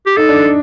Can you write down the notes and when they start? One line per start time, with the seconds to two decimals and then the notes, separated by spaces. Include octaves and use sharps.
0.06 G4
0.17 D#4 A4
0.29 D4